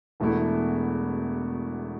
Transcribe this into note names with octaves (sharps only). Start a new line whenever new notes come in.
E1 E2 B2 A3 E4